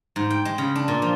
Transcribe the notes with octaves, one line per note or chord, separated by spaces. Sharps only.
G#2
G5
G#3
C#3
D4
A#2
F3